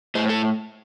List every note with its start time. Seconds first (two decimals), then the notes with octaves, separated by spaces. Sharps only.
0.15 A2 C5
0.30 A4